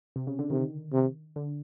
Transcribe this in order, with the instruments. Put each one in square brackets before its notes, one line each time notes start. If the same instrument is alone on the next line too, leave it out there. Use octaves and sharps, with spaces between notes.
[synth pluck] C3
C#3
D3
[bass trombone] C3 [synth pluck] D#3
[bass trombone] C3
[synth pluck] D3